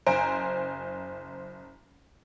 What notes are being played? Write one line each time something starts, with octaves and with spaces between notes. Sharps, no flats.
F#1 C5 G#5 A#5 D7